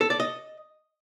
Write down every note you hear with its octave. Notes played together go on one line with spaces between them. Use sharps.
A4
D5
D#5